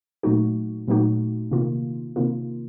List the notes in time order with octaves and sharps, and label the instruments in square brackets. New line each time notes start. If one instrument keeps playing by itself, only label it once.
[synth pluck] A#2 F#3 A3 D#4 F#4
A#2 F#3 A3 D#4 F#4
C3 D#3 A#3 F4
C3 D#3 A#3 F4